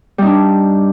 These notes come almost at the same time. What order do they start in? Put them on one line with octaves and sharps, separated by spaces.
G3 D#4 D4